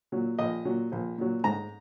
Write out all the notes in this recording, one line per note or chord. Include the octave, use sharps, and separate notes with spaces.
A#2 F#3
A#1 D#5
A#2 F#3
A#1
A#2 F#3
G#2 A#5